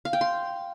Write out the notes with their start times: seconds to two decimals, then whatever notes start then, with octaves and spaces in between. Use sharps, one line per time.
0.05 F5
0.13 G5
0.21 C6